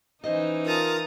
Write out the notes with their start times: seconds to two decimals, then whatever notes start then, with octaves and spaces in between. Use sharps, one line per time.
0.24 E3 C#4 D#4 C5 D#5
0.66 F4 A#4 A5 A#5 D#6